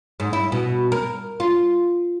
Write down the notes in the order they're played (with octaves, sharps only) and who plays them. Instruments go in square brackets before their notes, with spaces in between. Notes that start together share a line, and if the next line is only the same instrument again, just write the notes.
[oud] G#2
E4
B2
A#4
F4